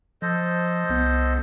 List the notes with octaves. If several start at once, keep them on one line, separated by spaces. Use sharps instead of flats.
F3 A4 C5 D#5
C2 B3